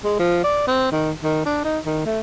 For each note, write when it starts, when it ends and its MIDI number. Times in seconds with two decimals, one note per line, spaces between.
0.04 0.19 56
0.19 0.41 53
0.44 0.63 74
0.67 0.91 60
0.92 1.12 51
1.23 1.43 51
1.46 1.62 62
1.64 1.79 63
1.86 2.06 51
2.06 2.21 57